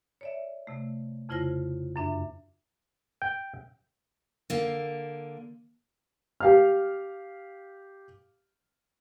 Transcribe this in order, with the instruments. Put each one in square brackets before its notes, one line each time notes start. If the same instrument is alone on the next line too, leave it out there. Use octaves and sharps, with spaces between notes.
[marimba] C#5 D5 E5
C3 A3
F2 C#3 E4 F4 C5 A#6
F#2 D4 E5
[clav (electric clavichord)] G5
[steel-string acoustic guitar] D3 A#3
[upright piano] G4 F5 F6